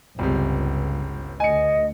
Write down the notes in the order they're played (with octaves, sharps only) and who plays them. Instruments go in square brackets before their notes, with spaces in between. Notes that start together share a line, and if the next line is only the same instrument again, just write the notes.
[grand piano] G1 C3 [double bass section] C#2
[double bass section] D2 [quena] D#5 [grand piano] G#5 C#7